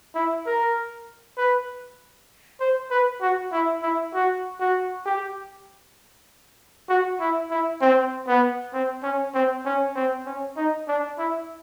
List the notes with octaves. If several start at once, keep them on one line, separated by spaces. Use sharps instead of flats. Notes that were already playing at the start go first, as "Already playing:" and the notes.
E4
A#4
B4
C5
B4
F#4
E4
E4
F#4
F#4
G4
F#4
E4
E4
C4
B3
C4
C#4
C4
C#4
C4
C#4
D#4
D4
E4